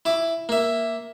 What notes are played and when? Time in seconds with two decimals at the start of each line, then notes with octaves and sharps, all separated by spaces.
0.05 E4 D6
0.49 A#3 E5